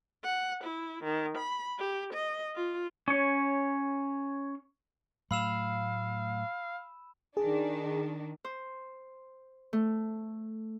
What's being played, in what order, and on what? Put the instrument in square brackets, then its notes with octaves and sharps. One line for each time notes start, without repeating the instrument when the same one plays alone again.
[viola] F#5
E4
D#3
B5
G4
D#5
F4
[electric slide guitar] C#4 C#5
[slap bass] A2 F#3 A3 [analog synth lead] F5 [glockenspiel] B5 E6 E7
[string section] D#3 D4 [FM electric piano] G#4
[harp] C5
A3